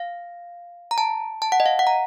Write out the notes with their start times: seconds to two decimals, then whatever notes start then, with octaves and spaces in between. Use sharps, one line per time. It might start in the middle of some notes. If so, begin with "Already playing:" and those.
Already playing: F5
0.91 A#5
0.98 A5
1.42 A5
1.52 F#5
1.60 D#5
1.66 F5
1.79 F#5
1.87 A#5